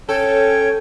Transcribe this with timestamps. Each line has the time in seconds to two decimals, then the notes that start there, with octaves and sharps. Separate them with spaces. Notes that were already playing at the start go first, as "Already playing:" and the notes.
0.09 C#4 A4 C#5 G5